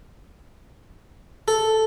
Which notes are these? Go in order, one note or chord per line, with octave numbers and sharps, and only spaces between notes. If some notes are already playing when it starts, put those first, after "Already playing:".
A4